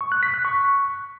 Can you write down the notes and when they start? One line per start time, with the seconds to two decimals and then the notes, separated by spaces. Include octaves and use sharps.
0.01 C#6
0.12 F#6
0.23 B6
0.34 F#6
0.45 C#6